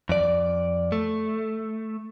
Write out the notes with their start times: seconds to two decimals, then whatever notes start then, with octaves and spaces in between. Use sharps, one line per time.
0.09 F2 D5
0.92 A3